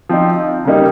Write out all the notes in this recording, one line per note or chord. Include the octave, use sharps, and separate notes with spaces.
F3 C4 D#4
C#3 G3 A#3 D#4